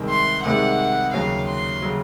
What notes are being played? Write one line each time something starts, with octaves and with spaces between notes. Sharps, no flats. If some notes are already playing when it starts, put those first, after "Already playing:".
Already playing: C2 C3 D#3 G#3
C6
C2 C3 D#3 G#3 F#5
D#2 C#3 F#3 F5
C6
C#3 F#3